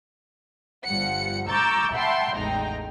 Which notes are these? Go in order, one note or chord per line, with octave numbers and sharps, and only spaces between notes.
G1 F3 G3 F#5 C#7
A#5 C#6 D6 E6 G6 A6
E5 F#5 G5 A5 B5 C6
A1 E2 G#3 D#4 G5 A#5